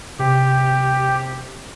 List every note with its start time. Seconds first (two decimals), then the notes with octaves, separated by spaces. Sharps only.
0.19 C3 G4